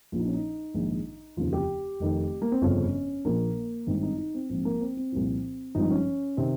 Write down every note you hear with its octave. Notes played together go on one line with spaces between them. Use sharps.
A#1 A#2 F3 F4
D#4
C#4
D#4
A#1 G#2 D#3
F1 D#2 C#3 F3 F4
G4
F1 F2 D#3
A#3
C4
G1 F2 C#3 F3 C#4
A#1 A#2 F3 A#3
G#1 G2 D#3 C4
D#4
D#4
C4
A#1 G#2 F3 C4
A#3
C4
C4
C2 A#2 F3
G#1 G2 F3 D#4
C#4
C3 D#3 C4